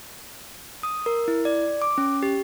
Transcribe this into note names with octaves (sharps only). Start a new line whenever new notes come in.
D#6
A#4
E4
D5
D6
C#4
G4